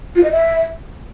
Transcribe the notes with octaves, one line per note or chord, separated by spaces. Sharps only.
F4
D#5
E5